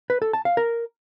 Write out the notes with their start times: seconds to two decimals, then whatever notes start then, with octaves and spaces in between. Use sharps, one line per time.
0.10 B4
0.22 A4
0.33 A5
0.45 F5
0.57 A#4